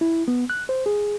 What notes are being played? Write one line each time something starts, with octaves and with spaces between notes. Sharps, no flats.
E4
B3
F#6
C5
G#4